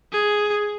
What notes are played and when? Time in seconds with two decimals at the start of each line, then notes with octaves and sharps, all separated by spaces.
0.12 G#4